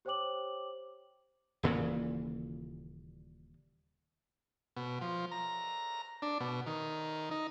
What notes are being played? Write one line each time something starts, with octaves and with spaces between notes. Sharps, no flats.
G4 C5 C#5 G5 D6 F#7
D#1 A#2 C#3 E3
B2
F3
A#5
D4
B2
D#3
D#4